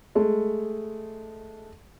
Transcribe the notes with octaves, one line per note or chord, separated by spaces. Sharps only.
G#3 A3